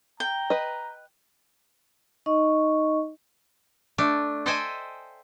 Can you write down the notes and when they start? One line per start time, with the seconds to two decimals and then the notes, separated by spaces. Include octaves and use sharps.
0.20 G5 A#5
0.50 B4 D#5
2.26 D#4 D#5 C#6
3.98 A3 D4
4.46 A4 C5 D#5 E5 G5 G#5